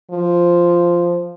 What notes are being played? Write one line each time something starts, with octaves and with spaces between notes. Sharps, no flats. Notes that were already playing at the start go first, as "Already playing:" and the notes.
F3